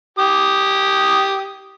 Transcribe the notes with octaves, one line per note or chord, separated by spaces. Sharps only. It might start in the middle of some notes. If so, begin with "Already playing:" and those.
G4 D#6